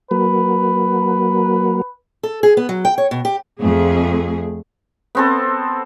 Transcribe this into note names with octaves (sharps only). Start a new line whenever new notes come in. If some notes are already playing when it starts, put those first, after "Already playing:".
F#3 A#3 B4
A4
G#4
B3
F#3
G5
C#5
B2
G4
F2 A3 G#4
B3 C4 A4